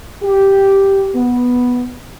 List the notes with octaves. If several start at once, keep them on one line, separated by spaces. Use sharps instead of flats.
G4
B3